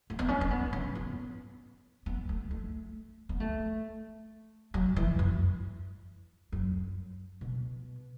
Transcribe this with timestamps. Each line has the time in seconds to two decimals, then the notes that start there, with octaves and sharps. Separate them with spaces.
0.10 A3
0.19 B3
0.28 C#4
0.41 C#4
0.51 B3
0.73 C#4
0.95 B3
2.06 B3
2.29 A3
2.51 A3
3.29 B3
3.40 A3
4.74 F#3
4.96 E3
5.19 F#2
6.52 F#2
7.41 B2